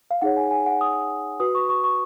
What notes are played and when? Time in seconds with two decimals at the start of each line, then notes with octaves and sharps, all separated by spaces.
0.11 F5
0.22 D#4 G#4 C#5 F#5
0.37 G#5
0.51 G#5
0.66 F#5
0.81 D#6
1.40 F#4 B4 D#6
1.55 C#6
1.69 C#6
1.84 C#6